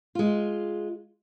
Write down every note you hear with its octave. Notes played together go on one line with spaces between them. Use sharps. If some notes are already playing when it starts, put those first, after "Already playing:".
G#3 F4